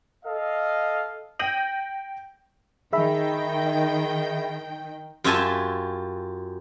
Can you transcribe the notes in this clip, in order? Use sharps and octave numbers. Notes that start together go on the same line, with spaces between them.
A4 D#5 F5
G5 G6 A#6 D#7 F#7
D#3 G#4 E5 G5 B5
F#2 F4 G4 E5 G#5 A5